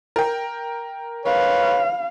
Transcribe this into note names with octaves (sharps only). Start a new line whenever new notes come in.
A#4 G5
B4 C#5 F5